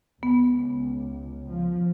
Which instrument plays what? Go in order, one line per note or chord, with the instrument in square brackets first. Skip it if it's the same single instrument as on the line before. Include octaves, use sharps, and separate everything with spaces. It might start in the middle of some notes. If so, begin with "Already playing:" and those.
[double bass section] C#2 [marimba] B3
[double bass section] F3